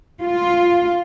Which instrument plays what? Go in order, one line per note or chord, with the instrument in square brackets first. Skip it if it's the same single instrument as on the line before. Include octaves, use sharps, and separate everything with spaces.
[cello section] F4